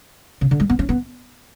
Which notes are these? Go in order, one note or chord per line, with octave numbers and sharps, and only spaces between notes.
C#3
D3
G#3
B3
C#4
B3